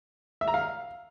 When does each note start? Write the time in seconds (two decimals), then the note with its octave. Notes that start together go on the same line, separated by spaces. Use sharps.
0.41 E5
0.48 A#5
0.54 F5